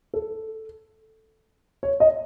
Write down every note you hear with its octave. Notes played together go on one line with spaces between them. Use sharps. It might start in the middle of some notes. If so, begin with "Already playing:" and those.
A4
C#5
D#5